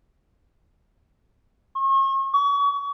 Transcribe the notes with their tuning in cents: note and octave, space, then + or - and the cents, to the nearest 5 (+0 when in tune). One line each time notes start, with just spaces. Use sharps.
C#6 -40
C#6 +35